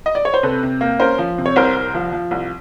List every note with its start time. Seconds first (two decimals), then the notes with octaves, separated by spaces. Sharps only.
0.06 D#5
0.15 D5
0.25 C#5
0.34 C5
0.43 C3 A4 B4
0.63 C3
0.81 A#3
1.00 C#4 A#4 C5
1.18 F3
1.38 C3
1.46 C#5
1.56 C2 A#4 C5
1.76 C2
1.94 F3
2.12 F3
2.31 C2